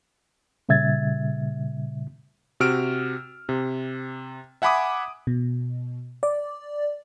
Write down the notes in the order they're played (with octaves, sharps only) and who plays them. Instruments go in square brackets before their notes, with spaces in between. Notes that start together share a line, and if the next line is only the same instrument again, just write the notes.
[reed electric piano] A#2 C#3 G3 E5 G#6 A6
[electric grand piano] C3 F#4 E6 F6 D7
C3
E5 F#5 G#5 B5 D6 D#6
[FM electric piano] B2
D5